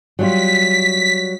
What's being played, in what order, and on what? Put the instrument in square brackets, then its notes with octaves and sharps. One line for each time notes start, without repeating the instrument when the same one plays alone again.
[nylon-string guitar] F#3 G3 F4 [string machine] B6